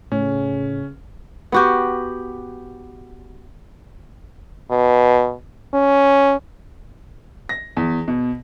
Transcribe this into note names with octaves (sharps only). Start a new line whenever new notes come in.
A2 C#3 C#4
B3 F#4 G4
B2
C#4
A#6
E2
B2